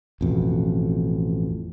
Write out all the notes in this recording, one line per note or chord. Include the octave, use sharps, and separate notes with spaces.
A1 F2 B2